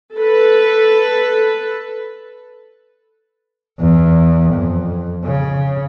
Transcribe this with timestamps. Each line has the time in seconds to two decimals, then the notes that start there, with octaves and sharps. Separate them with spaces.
0.15 A4 B4
3.80 E2
4.53 F2
5.25 C#3